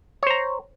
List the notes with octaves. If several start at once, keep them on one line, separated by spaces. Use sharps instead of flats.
C5 C#5 A#5